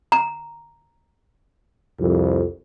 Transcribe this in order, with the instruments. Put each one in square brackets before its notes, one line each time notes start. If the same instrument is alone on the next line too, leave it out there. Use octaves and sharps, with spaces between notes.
[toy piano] A#5
[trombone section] C2 F2